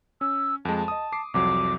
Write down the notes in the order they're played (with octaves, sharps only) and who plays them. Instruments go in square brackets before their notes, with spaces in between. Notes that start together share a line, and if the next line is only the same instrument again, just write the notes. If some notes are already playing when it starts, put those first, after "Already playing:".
[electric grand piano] C#4 [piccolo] E6
[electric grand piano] F2 G#3 [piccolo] A5
[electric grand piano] D#5 D#6
D6 C7
[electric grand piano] C2 F2 F#3 [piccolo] D6